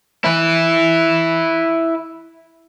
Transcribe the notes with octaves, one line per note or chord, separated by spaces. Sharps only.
E4 B4